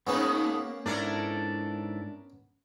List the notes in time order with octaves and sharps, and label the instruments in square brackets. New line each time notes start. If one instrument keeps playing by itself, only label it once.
[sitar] G#2 B2 D#4 [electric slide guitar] A#3 [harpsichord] B3 C#4 B4
[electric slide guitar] G#2 E4 A4 [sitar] D4 A#4 D5